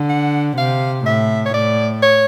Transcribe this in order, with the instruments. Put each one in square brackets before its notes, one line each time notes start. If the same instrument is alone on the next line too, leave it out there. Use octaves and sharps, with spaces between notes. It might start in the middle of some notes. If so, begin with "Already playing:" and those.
Already playing: [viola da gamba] D3
[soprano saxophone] F#5
[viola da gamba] C3 [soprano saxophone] F5
[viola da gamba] A2 [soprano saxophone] E5
[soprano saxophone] C#5
[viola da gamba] A2 [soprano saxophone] D5
[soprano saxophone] C#5